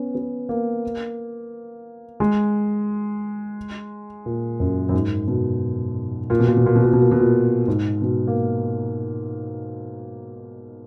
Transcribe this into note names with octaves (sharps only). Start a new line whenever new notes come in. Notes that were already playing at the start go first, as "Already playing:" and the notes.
Already playing: B3 C#4
B3
A#3
G#3
A#2
F#2
F#2
G#2
B2
A#2
B2
A#2
B2
A#2
B2
A#2
B2
A#2
B2
A#2
G#2
B2
A#3